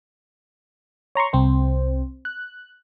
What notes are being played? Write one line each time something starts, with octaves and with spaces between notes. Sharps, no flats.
C#5 A#5 C6 C#6
C2 C4 C5
F#6